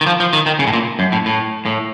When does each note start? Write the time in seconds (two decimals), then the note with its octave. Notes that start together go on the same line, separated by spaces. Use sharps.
0.01 D#3
0.06 F3
0.20 F3
0.33 D#3
0.46 D#3
0.59 C#3
0.67 A2
0.73 A#2
0.99 F#2
1.12 A2
1.26 A2
1.66 A2